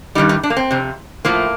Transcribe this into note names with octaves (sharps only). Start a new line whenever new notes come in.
G2 D#3 G3 D#4
D#4
D4
A#3
C4
F2 C3
A2 F3 A#3